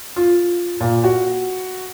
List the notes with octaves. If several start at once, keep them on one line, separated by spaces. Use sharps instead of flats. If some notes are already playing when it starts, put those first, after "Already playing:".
F4
A#2
F#4